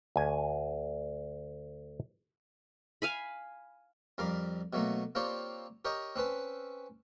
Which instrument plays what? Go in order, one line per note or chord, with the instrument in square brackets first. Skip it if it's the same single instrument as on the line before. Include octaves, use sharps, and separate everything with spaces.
[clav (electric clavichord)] D2 G#5
[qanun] F5 G#5 B5
[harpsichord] F2 G3 A#4 F5 B5 D6
B2 F#3 A3 A#3
A#3 C4 F4 G4 C#5 D5
G4 A#4 C#5 D#5 G5
C4 C#4 B4 A5